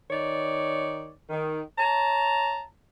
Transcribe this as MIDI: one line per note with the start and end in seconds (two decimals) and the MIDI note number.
0.11 1.11 51
0.11 1.11 63
0.11 1.11 73
0.11 1.11 74
1.30 1.61 51
1.78 2.62 73
1.78 2.62 81
1.78 2.62 82